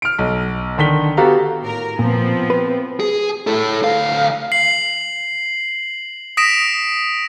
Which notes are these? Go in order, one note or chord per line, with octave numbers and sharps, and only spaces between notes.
F6 D7
B1
D3 D#3 B6 G7
B3 F#4 G4 A4 F5 A#5
A2 A#4
A#2 F3 B3 C4
B4
G#4
E4 A4
D2 F5
C7 F#7
D#6 A#6 B6 D7 E7